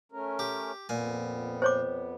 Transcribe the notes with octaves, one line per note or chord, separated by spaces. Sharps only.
A3 C#4 A#4
G4
F2 A#2 B3 G#5
C5 C#5 D6